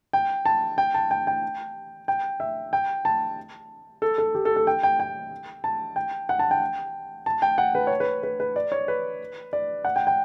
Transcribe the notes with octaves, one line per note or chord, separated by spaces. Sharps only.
G5
A5
G5
A5
G5
G5
G5
E5
G5
A5
A4
A4
G4
A4
A4
G5
G5
G5
A5
G5
F#5
A5
G5
A5
G5
F#5
B4
C#5
B4
B4
B4
D5
C#5
B4
D5
F#5
G5
G5